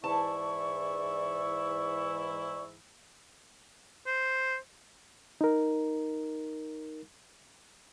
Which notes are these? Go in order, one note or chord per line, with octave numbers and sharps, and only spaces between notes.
G#2 E3 E4 D5 A5 C#6
C5
D#4 A#4